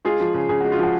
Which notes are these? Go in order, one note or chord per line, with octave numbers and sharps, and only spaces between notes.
G#3 F4 G#4
F3
C#3
C#3 G#4
G#3 F#4
F4
F3 F#4